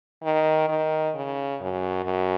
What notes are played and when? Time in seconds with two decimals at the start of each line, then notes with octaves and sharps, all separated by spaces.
0.23 D#3
0.69 D#3
1.15 C#3
1.61 F#2
2.05 F#2